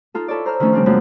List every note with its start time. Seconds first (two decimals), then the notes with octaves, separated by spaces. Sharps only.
0.14 D#4 F4 A4
0.28 E4 A4 C#5 D5
0.45 C5 A#5 E6 F6
0.60 D#3 F3 A3 C#4 D4
0.73 C#3 G3 C4 D4 F4
0.86 F#2 F3 G#3 A#3 C#4 F4